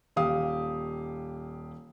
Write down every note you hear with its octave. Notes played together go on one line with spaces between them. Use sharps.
D#1 G4 F5 D#6